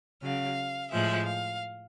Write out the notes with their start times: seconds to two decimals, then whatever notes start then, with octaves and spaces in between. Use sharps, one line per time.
0.23 C#3 F#3 F5
0.91 A2 F3 G#3 E5
1.26 F5